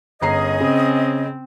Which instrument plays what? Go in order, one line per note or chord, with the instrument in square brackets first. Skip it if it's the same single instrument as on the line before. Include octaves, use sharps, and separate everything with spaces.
[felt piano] G1 A#5 C7 [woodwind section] C#4 G#4 D#5
[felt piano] C#3 [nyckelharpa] C4